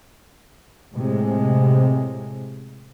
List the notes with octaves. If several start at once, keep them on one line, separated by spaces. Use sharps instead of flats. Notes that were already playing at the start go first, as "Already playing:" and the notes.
A2 C3 G#3